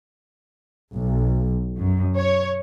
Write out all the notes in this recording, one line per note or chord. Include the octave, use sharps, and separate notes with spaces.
B1
F#2
C#5